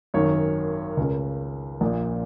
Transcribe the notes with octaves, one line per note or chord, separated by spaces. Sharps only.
G#1 F#2 D#3 C#5
C#2 C#3 A#4
A#1 A#2